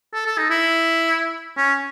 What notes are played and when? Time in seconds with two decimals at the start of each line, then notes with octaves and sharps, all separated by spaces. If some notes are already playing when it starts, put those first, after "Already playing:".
0.13 A4
0.26 A4
0.38 D#4
0.50 E4
1.57 C#4